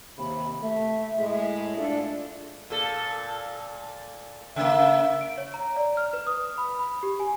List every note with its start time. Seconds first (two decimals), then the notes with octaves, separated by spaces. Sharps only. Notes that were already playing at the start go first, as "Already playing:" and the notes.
0.18 D#2 C3 B5
0.62 A3 E5
1.18 A2 G#3
1.78 D4 F4 A4
2.70 A#2 A4
4.56 C#3 A#3 E5
5.21 D7
5.38 C#5
5.54 A#5
5.76 D5
5.97 F6
6.13 B4
6.27 D#6
6.58 B5
6.79 B5
7.03 G4
7.20 G#5